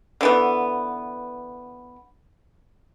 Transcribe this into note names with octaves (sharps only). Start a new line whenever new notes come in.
D3 E3 B3